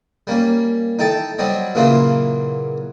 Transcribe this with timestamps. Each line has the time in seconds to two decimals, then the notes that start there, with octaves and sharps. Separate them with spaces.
0.27 G3 A#3 C#4
0.99 D#4 E4 A4 G5 A5
1.38 F#3 G3 C4 C#5 D#5
1.75 A#2 C#3 E3 F#3 A#3 F4